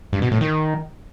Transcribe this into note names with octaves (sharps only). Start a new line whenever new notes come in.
G2
B2
A2
D#3